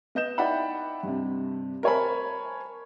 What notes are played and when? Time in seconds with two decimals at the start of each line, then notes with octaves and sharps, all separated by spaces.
0.15 B3 D#5 G6 E7
0.38 D#4 E4 D5 F#5 G5 B5
1.03 G2 C3
1.83 A#4 C5 C#5 G#5 A5 B5